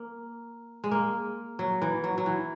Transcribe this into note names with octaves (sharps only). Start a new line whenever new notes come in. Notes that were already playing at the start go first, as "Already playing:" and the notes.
Already playing: A#3
G#3
A#3
F#3
E3
F#3
F#3
E3